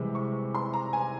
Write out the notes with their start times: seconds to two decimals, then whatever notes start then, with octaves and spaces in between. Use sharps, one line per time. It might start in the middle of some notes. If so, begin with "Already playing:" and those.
Already playing: C2 C3 E3 G#3
0.15 C#6
0.55 C6
0.73 A#5
0.93 G#5